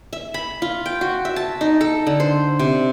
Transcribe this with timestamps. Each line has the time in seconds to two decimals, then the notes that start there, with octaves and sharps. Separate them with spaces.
0.13 E5
0.34 B5
0.62 F4
0.86 G5
1.01 F#4
1.25 E5
1.36 A5
1.61 D#4
1.81 A4
2.07 D3
2.20 C5
2.59 C3